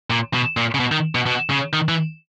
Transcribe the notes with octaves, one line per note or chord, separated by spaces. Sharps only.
A#2
B2
A#2
C#3
B2
D#3
B2
B2
C#3
D#3
E3